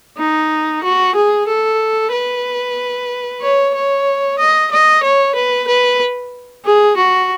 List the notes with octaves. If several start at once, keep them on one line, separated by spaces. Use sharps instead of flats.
D#4
F#4
G#4
A4
B4
C#5
C#5
D#5
D#5
C#5
B4
B4
G#4
F#4